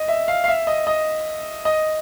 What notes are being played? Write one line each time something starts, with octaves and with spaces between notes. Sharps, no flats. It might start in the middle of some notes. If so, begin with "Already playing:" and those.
Already playing: D#5
E5
F5
F5
E5
D#5
D#5
D#5